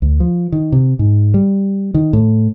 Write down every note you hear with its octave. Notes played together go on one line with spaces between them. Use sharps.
D2
F3
D#3
C3
G#2
G3
D#3
A2